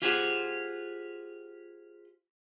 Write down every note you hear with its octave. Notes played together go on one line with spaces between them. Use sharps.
F4 G4 G#4 C5 F#5